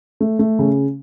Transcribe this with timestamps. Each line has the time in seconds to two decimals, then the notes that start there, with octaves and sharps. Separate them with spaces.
0.21 A3
0.39 A3
0.59 C#3